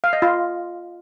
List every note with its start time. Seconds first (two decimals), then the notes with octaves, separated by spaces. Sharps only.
0.04 F5
0.13 D#5
0.22 F4